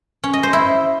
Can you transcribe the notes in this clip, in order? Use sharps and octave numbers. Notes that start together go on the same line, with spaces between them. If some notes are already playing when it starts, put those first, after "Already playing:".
C#4
D#5
C5
E4